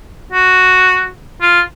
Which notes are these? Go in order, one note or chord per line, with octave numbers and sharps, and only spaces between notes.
F#4
F4